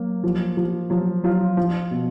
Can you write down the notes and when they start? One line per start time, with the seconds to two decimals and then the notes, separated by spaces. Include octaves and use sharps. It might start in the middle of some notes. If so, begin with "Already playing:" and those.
Already playing: F#3 A#3
0.24 F3
0.57 F3
0.90 F3 F#3
1.24 F#3 F4
1.57 F3 F4
1.91 B2